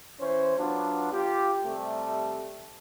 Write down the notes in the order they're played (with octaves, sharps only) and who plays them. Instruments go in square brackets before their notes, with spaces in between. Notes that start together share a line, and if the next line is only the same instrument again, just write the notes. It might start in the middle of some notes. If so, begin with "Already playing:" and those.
[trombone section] E3 C#4 C5
F#3 B3 D4 F4
F4 G4
C3 G3 A3